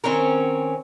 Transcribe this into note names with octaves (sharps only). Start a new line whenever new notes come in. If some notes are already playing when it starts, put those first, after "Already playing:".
D#3 C4 C#4 A#4